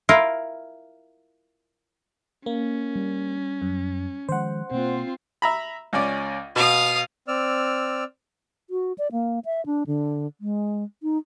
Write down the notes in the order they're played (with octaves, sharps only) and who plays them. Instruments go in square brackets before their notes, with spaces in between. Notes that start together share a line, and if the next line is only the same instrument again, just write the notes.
[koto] E4 F4 A#4
[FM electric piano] A#3 [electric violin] C#4
[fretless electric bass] G3
[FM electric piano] F#2
[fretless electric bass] D#3 F3 G#3 [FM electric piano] C5 F#5
[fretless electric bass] B2 A#3 [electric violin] C4 F4
[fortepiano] E5 A#5 B5
C#2 C#4 D5
[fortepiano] B2 [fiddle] F5 D#6
[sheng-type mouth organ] C4 D5 E6 F6
[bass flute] F#4
D5
A#3
E5
D4
D3
G#3
D#4